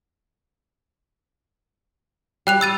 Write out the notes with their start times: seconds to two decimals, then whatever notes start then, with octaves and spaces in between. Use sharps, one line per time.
2.47 G3 G5 F#6 F7
2.61 E6 A6 D#7